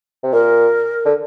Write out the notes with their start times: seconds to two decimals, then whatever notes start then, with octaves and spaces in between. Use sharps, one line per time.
0.23 C3
0.33 A#2 A#4
1.05 D3